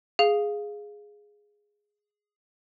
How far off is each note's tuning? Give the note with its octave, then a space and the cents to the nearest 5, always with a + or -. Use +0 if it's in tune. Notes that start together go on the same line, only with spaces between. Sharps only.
G#4 +0 F5 +0